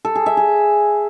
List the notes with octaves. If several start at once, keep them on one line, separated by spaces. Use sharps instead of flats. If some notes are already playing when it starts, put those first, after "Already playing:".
A4
G#4
E5
G#4